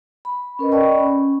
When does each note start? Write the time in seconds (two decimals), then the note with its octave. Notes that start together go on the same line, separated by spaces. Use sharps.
0.25 B5
0.59 C#4 A#4 B4 D#5
0.72 D5 D#5 G5 A5 B5 C#6
0.99 C#4